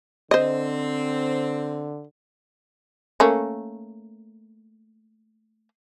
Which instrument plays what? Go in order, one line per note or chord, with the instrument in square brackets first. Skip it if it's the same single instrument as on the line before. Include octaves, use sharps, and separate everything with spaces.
[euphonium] D3 [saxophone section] C4 [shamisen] C5 D#5
[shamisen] A3 A#3 C#4